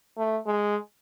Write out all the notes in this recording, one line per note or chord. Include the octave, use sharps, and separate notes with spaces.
A3
G#3